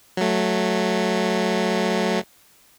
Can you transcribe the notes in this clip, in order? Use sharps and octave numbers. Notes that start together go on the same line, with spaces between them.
F#3 A3